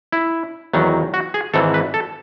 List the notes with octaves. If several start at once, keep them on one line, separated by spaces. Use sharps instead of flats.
E4
E2 D#3 F#3
F#4
G#4
G#1 G#2 E3 A4
B4
A4